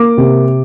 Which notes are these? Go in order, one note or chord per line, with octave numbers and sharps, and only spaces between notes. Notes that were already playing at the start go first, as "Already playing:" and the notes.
Already playing: A#3 D6
C3